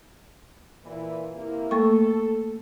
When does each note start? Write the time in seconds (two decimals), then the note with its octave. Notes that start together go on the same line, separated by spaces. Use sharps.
0.84 A#2 E3
1.35 C3 A#3 E4
1.71 A3 A#3 A4 C#6